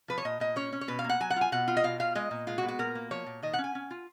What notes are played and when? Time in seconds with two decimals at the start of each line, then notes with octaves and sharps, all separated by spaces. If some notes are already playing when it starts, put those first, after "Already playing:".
0.08 F3 B4
0.18 C#5
0.25 A#2 D#5
0.40 A#2 D#5
0.56 C#4 C#5
0.73 C#4
0.81 C#5
0.88 B2 B4
0.99 F5
1.04 A#3
1.09 F#5
1.20 F#3 G#5
1.30 F#5
1.36 F4 G#5
1.52 B2 F#5
1.68 F4
1.77 D#5
1.84 B2 F5
2.00 F4 F5
2.15 G#3 D#5
2.31 A#2
2.47 G#3 F4
2.58 F#4
2.63 B3
2.68 F#4
2.79 A#2 A#4
2.95 A#3
3.11 F3 C#5
3.26 A#2
3.43 D#3 D#5
3.53 F#5
3.58 C#4
3.64 G#5
3.75 C#4
3.91 F4